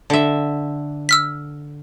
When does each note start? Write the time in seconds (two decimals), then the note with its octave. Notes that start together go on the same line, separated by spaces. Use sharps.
0.10 D3 E5
1.09 E6 F6 B6